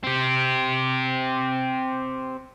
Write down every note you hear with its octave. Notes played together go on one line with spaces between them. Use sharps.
C4 G4